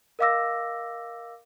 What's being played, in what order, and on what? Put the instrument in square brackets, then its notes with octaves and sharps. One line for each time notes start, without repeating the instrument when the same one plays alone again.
[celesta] A#4 D#5 F5 D6 E6 A#6